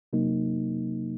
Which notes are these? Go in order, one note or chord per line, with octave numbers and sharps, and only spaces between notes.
C3 F#3 A#3 D#4